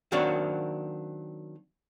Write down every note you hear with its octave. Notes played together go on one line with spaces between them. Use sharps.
D#3 F#3 A#3 C4 D4 F#4